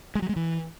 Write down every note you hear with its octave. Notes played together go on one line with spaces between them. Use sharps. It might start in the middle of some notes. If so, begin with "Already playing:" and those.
G#3
F#3
G#3
E3